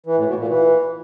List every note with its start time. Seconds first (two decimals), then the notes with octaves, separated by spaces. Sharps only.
0.06 E3
0.17 A2
0.28 B2
0.38 A#2
0.49 E3